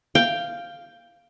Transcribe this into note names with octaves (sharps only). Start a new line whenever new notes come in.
F5 G5